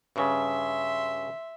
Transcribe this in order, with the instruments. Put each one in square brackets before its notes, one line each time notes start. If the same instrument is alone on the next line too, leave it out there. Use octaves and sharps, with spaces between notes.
[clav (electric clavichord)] G2 C#3 [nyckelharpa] E5 C6